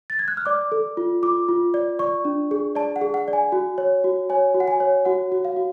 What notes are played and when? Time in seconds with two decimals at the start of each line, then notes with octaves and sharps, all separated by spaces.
0.10 A6
0.19 G#6
0.28 F#6
0.37 F6
0.46 D5 D6
0.72 A4
0.97 F4
1.22 F4 D6
1.48 F4
1.74 D5
1.99 D5 C#6
2.25 D4
2.51 G#4
2.75 D5 A5
2.96 F#5
3.01 G#4
3.14 F#5
3.28 D5
3.33 G#5
3.52 F#4
3.78 C#5
4.04 F#4
4.30 C#5 G#5
4.54 F#4
4.60 F#5
4.68 G#5
4.80 C#5
5.05 F#4 F#5
5.32 F#4
5.45 F5
5.56 F#4